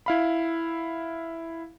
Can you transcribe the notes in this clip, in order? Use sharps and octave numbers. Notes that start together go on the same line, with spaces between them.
E4 F5 B5